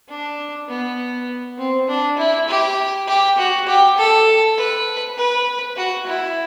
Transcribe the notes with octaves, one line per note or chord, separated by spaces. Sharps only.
D4
B3
C4
D4
E4
G4
G4
F#4
G4
A4
B4
B4
F#4
E4